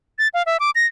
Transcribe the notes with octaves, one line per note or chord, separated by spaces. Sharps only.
A6
F5
E5
D6
A#6